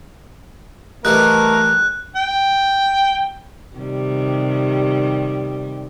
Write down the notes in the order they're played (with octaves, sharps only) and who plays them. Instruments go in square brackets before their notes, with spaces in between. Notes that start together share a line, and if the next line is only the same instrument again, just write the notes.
[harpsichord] E3 G3 D#4 [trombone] A3 [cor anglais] A#4 [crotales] F#6
[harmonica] G5
[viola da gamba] C3 D#3 G3